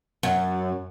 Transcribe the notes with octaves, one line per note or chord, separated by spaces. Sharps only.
F#2